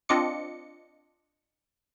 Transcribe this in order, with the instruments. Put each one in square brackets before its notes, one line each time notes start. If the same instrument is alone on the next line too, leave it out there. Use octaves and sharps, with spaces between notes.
[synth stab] C4 D4 F4 D#5 D6 C#7